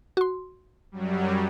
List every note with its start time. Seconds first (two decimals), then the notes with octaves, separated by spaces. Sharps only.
0.17 F#4 C6
0.92 F#2 F#3 G3